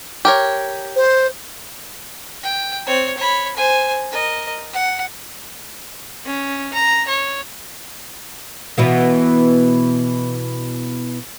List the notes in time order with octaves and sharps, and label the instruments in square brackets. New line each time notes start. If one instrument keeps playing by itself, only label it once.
[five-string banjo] G4 A#4 C#5
[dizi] C5
[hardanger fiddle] G5
C4 C#5
C#5 B5
C5 G#5
A#4 D#5
F#5
C#4
A#5
C#5
[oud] B2 E3 B3